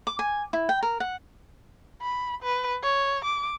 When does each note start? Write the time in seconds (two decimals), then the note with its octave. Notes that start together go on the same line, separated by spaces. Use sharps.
0.07 D6
0.19 G#5
0.53 E4
0.69 G5
0.83 A#4
1.00 F#5
2.02 B5
2.43 B4
2.83 C#5
3.25 D6